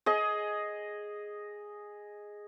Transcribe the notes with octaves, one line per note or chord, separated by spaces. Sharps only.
G#4 D#5